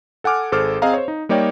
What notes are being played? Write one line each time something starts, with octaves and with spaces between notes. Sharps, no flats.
A4 F#5 G#5 D6 F6
G#1 G#4 A4 C5 D6 F6
C4 G#4 D#5 F5 A#5
C5 C#5
D#4
G3 A#3 D#4 C#5 D5 G5